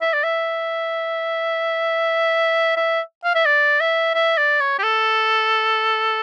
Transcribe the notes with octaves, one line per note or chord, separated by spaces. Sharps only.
E5
D5
E5
E5
F5
E5
D5
E5
E5
D5
C#5
G4
A4